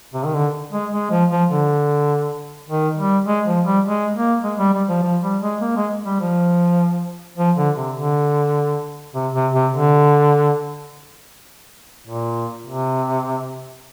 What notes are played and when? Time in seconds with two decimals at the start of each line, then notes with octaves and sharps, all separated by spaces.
0.13 C3
0.26 D#3
0.34 D3
0.72 G#3
0.92 G#3
1.11 F3
1.30 F3
1.51 D3
2.68 D#3
2.98 G3
3.26 G#3
3.47 F3
3.66 G3
3.86 G#3
4.15 A#3
4.44 G#3
4.59 G3
4.73 G3
4.89 F3
5.03 F3
5.23 G3
5.41 G#3
5.61 A#3
5.76 G#3
6.06 G3
6.20 F3
7.38 F3
7.57 D3
7.77 C3
7.96 D3
9.14 C3
9.34 C3
9.53 C3
9.73 D3
12.07 A#2
12.67 C3